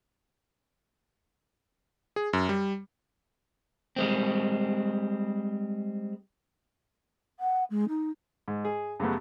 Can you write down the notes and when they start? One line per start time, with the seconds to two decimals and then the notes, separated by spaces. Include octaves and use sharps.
2.16 G#4
2.33 F#2
2.49 G3
3.96 G3 G#3 C4
7.40 F#5
7.70 G#3
7.89 D#4
8.48 G#2
8.65 G#4
9.00 F#2 C#3 G3 A3 B3